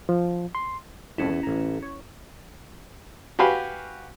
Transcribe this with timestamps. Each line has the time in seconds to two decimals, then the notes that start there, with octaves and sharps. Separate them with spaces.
0.09 F3
0.55 C6
1.18 C2 F2 A2 C#4 E4
1.30 E2
1.43 A1 A#5
1.82 C#5
3.39 F#4 G4 B4 F5 G#5 B5